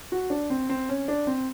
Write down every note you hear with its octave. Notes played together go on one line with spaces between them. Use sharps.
F#4
D4
C4
C4
C#4
D4
C4